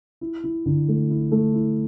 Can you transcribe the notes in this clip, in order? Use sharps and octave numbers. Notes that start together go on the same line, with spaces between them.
E4
E4
D3
A3
E4
A3
E4